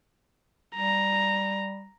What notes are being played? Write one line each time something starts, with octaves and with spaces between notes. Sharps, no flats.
G3 A#5